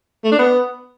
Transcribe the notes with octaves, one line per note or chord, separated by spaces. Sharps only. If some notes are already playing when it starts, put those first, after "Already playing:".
A3
D4
B3